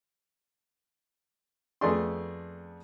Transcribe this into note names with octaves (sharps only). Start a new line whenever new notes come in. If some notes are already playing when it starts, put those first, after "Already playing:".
F2 A3 B3 G#4 D5 C6